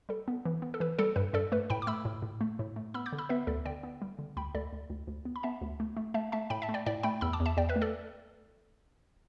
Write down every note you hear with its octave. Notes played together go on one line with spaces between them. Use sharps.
G3 A4
B3
E3
B3
A4
E3 B4
G3 A4
G2 B4
G2 A4 D5
A3 B4
A2 G5 B5
D6
A3 B5 E6
A2
A2
A3
A2
A3
B3 B5 E6
D6 G6
D3
B5 E6
B3 B4 E5
D2 A4 D5
D3 D5 G5
B3
G3
D3
D2 G5 B5
D2 A4 D5
D2
D2
D2
B3
B5
B3 E5 A5
D2
A3
A3
A3 E5 A5
A3 E5 A5
A2 G5 B5
E5 A5
A3
D5 G5
A2 D5 G5
A3 G5 B5
E2 B5 E6
A5 D6
E2
E5 A5
E2 D5 G5
B4 E5
A3
A4 D5